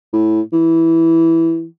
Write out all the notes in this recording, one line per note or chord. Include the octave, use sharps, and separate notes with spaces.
A2
E3